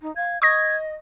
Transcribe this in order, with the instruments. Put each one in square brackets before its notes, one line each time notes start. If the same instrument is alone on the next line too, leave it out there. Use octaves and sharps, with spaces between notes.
[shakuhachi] D#4
[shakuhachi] F5 [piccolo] G#6
[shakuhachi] D#5 [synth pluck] C#6 D#6 A#6 [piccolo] G#6